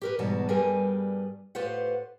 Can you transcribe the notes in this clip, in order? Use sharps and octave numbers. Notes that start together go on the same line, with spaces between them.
G4 A#4 B4
E2 G#2 B2 G3 F#4 A5
G2 G3 G#4 A#4 B4 G#5
A2 F4 G4 B4 C5 F#5